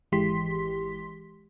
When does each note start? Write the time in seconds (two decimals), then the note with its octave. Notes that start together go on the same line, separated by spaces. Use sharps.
0.12 G#1 E3 G#3 G4 C6 B6